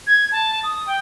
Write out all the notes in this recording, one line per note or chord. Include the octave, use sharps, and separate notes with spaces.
G#6
A5
D#6
G5